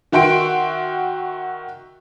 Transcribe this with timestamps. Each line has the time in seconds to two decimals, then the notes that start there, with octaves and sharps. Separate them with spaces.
0.12 D#3 F#4 E5 G5 C6 D7